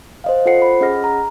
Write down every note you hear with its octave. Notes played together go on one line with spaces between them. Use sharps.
C5 D#5 F5
F4 A4 C5 F#5 C7 C#7
B5
C#4 G#4 D#5 F#5 F6 A#6
A#5